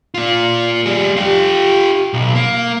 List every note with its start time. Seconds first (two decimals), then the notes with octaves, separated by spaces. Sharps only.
0.14 A#3 F4
0.86 G3 G#4
1.17 F4 G4
2.13 B1
2.35 A#3